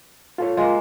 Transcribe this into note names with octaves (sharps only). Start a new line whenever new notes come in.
F4 A4 C#5
G#3 A#3 F4